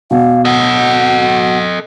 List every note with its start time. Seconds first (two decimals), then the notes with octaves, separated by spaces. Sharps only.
0.11 B2 F5
0.45 A4 D#5 F#5